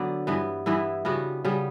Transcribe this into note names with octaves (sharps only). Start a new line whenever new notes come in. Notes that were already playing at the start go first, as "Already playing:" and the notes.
Already playing: D3 F#3 B3 D5
G2 E3 B3
G2 E3 B3 E4
C#3 G3 B3 F#4
C#3 G3 B3